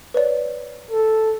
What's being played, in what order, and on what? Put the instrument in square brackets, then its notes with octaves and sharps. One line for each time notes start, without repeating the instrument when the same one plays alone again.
[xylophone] B4 C#5 D5
[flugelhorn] A4